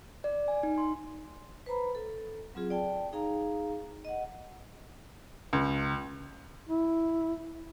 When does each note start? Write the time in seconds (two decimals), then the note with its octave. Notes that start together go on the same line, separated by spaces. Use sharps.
0.24 D5
0.48 G#5
0.63 D#4
0.78 C6
1.66 B4 C5 A#5 B5
1.95 A4
2.55 F#3 C4 F4 G#4
2.70 D5 G5 A5
3.13 D#4 G#4 F5 A#5
4.05 D#5 F#5
5.53 C#2
6.69 E4